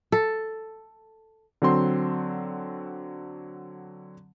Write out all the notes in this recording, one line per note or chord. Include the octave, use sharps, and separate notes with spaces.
A4
D3 F#3 C4 C6